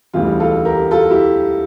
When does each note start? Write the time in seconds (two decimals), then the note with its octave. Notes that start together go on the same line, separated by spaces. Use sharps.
0.14 E1 D2 C#3 E3 G3 F4
0.40 F4 A4
0.65 G4 A#4
0.91 F4 A4
1.10 E4 G4